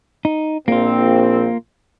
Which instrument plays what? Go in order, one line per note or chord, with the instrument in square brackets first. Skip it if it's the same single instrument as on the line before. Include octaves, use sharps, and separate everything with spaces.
[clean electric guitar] D#4
[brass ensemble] A#1 C4 [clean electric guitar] A#3 F4